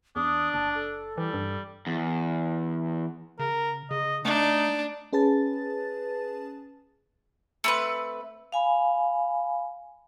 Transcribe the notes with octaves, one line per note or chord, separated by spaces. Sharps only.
E2 D4 D#6
F#1 A5
A4
E3 G3
G2
E2
C#3 A#4
C#3 D#5
A3 D4 D#4
C#4 G#4 B4 A5 A6
A3 C4 B4
F5 G#5 B5